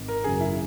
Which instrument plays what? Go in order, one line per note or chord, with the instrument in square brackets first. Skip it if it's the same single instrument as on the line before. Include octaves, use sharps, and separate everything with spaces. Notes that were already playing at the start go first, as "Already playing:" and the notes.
Already playing: [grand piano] G#1
[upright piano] A#4
[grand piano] F#2 C#3 F#3 A#3 [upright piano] G#4
[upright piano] E4